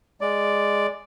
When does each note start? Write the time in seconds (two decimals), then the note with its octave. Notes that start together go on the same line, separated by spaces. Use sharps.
0.21 G#3 D5